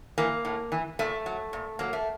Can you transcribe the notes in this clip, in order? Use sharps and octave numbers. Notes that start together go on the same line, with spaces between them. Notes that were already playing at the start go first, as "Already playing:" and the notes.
E3 A#3
A2
E3
A#2 A3
F#3
A#2
F#3 A#3
A3